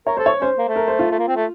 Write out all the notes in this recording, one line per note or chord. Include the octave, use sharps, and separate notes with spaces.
A#4 C#5
A4 C5
C#5
C#4 C5
A#3
A3
A#4
C5
F4
A3
A#3
C4
A3